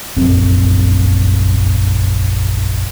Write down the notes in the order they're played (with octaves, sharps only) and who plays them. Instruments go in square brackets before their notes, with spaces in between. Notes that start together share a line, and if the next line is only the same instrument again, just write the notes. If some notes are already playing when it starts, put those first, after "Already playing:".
[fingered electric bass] F1 A#1 F#2 C4